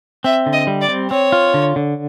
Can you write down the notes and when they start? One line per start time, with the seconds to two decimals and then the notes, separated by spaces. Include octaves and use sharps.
0.24 C4 E5
0.46 D3
0.53 D#5
0.67 G3
0.81 D5
0.88 C4
1.11 C4 C#5
1.32 F4
1.54 D3
1.76 D3